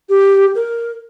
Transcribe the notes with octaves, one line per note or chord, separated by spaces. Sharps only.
G4
A#4